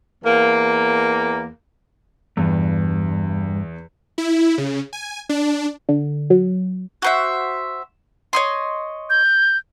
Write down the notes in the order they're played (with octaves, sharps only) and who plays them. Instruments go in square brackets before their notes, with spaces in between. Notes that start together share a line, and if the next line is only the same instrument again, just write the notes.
[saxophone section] E2 A#3
[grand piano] E2 [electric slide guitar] G2
[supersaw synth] E4
C#3
G#5
D4
[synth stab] D3
F#3
[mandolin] F#4 C5 E5
C#5 D#5 C6
[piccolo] G6